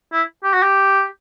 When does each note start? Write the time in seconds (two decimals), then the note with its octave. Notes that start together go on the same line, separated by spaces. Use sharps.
0.13 E4
0.44 G4
0.54 F#4
0.63 G4